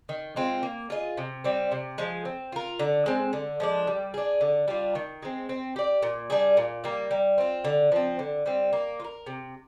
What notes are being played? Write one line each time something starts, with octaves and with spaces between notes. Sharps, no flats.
D#3
G#3 C4 F4
A#3
F4 G#4 D#5
C3
G3 C4
C3
F3 G#3
C4
F4 A#4
D3
G#3 C4
D3
F3 G#3 D4
G3
D4 G#4
D3
G3 D4 F4
D#3
G#3 C4
C4
G4 D5
A#2
G3 D4 G#4
A#2
G3 A#3
G3
C4 F4
D3
F3 C4
D3
G3 C4
A#3
F4
A#4
C3